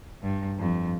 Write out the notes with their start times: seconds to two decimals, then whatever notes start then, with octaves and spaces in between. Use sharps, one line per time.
0.22 G2
0.57 F2